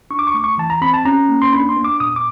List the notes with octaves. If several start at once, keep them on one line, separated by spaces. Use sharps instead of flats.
D4 C#6
D6
C#6
A3 D6
C#6
E3 A5
A#5
C4 B5
A5
C#4 A#5
A#3
C6
D4 B5
C6
B3
D6
A#2 D#6
D6